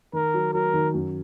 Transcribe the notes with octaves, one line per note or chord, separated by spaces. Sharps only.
D#3 A#4
F#3
F#3 A#4
D#3
F#2